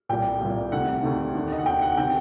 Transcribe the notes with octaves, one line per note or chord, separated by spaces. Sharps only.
C2 A#2 G5
C2 A#2
D2 C3 D#3 F#5
D2 C3 D#3
D#2 D3
D#5
F#5
D#2 D3 G5
F#5
C3 D#3 G5